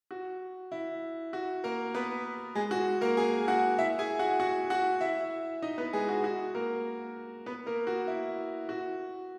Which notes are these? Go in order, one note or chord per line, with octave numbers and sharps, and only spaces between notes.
F#4
E4
F#4
A#3 A#4
B3 B4
G#3 G#4
F#4
A#3 A#4
G#4 G#5
F#4 F#5
E4 E5
G#4 G#5
F#4 F#5
F#4 F#5
F#4 F#5
E4 E5
D#4 D#5
B3 B4
G#3 G#4
F#4
F#4
A#3 A#4
B3 B4
A#3 A#4
F#4
E4
F#4